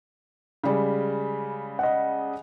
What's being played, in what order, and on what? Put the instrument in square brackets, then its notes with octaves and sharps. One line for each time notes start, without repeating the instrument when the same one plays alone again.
[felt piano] C#3 G3 G#3
[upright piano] D#5 F#5